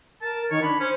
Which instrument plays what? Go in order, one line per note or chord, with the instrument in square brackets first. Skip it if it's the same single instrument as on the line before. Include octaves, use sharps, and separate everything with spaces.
[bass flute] A#4 [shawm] A5
[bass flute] D#3 [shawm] C#5
[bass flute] D4 [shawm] B5
[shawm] C#4 [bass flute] C5